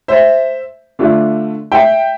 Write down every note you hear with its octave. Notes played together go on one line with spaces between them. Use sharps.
C5 E5
D3 A3 D4 F4
E5 G5